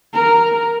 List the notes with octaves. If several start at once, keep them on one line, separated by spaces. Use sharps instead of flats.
A#4